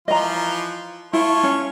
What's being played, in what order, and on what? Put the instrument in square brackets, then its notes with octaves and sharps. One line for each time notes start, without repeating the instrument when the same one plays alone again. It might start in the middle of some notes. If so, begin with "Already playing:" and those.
[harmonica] E3 F3 F4 [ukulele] D#5 A#5
[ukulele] E4 [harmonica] F4 A4 C#5
[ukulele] C#4